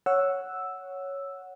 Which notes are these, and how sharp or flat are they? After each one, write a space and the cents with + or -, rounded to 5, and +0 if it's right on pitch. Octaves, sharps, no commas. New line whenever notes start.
C#5 +0 F#5 -5 E6 +0